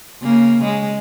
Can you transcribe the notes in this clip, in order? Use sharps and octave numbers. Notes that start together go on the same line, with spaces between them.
C#3 A#3
G#3